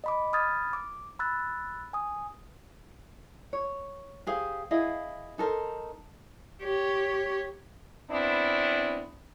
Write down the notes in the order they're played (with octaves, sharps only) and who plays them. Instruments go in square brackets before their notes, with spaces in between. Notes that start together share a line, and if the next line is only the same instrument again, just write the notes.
[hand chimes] D#5 B5 D6
B5 D#6 F6 G#6 A6
D6
B5 E6 F#6 A6
G#5 D#6
[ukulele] C#5
G4 G#4 C5 F5
E4 G#4 D#5 F5
D#4 A4 A#4 C5
[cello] G4 C#5
[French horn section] B3 C4 D4 E4